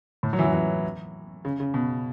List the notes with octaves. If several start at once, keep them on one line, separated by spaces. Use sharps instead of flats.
A2
F#3
E3
F#3
E3
C#3
C#3
B2